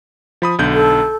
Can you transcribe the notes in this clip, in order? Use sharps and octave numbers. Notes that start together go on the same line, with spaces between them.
F3 B5 D#6
B1 D3 G6
A4